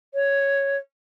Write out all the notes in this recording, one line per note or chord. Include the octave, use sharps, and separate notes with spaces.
C#5